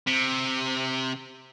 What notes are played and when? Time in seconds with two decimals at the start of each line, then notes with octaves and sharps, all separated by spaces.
0.07 C3